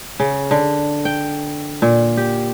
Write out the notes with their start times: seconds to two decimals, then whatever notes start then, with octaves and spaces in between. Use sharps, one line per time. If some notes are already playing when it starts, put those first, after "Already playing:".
0.20 C#3
0.51 D3
1.05 G5
1.82 A#2
2.17 G4